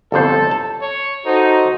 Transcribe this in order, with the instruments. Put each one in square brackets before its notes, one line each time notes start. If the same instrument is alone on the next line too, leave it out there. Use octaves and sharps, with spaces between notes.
[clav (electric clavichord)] G1 F2 C5 [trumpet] A4
[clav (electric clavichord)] A5
[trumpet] C#5
[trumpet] D#4 [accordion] F#4 A4 C5